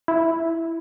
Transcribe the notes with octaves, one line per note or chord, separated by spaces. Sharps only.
E4